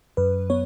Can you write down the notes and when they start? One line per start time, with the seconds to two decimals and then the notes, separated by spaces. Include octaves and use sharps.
0.17 F#2 B4
0.50 B3 C#5